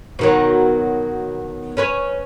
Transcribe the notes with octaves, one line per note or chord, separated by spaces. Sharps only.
B2 D#3 F#3
C#4 B4 C#5